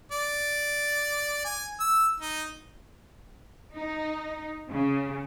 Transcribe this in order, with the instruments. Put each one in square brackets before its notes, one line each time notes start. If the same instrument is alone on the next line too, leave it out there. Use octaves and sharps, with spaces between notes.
[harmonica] D5
G#5
E6
D#4
[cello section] D#4
C#3